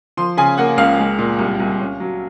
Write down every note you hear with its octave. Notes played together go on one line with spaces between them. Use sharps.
F3 C6
C#3 G#5
A#3 F#5
C#2 F5
G#3
A#2
C2
C2
C#4
F#3